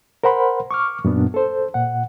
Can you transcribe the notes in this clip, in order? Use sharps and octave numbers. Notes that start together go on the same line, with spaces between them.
A#4 C5 F#5 B5 C6
C#6 D6 F6
F#2 A#2 B3 D4
A4 C5
A#2 F#5